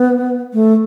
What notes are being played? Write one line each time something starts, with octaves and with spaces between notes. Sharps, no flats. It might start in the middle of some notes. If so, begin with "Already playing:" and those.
Already playing: B3
A3